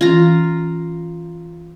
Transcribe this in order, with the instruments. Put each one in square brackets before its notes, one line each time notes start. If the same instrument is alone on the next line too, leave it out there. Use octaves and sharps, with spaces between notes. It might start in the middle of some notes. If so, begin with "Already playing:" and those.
[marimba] E3 C#4 [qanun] F4 A#5